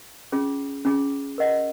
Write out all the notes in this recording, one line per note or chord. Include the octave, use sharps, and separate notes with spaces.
C#4 F4 G#4
C#4 F4 G#4
A#4 D#5 F#5